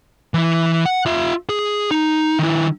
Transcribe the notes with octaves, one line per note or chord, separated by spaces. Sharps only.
E3 E4
F#5
F4 E5
G#4
D#4
D#3 E4